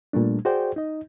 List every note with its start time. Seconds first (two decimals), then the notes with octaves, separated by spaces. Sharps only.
0.13 A#2 G3 A3 D4
0.45 F#4 G#4 C5 D5 G5
0.76 D#4 D#5